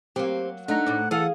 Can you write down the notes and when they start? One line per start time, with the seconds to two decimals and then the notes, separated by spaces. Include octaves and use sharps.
0.16 F#3 A#3 C4 G4
0.68 A3 D4 D#4 F#5 A#5
0.86 A2 D5
1.11 E3 G#4 A4 F5 F#5